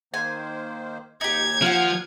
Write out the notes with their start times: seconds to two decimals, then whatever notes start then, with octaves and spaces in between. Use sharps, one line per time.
0.14 D#3 A#3 C5 G#5
1.21 D#2 D#4 G4 G#6
1.62 F3 F5 F#5